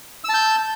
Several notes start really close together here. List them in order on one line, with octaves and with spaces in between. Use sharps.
E6 A5 G6